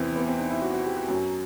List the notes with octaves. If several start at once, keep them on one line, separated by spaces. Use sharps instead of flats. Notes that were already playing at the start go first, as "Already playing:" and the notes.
Already playing: E2 C3 E3 C4
B3
C4
D#4
E4
F#4
F#4
G4
F#4
F#2 F#3